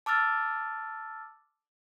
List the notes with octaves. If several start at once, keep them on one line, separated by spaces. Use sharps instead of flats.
A5 D6 E6 F6 A6